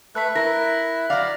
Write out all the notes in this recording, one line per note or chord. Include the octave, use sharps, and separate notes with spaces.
A3 A4 B4 F#6 B6
E4 A#4 A#6
F#3 D5 F5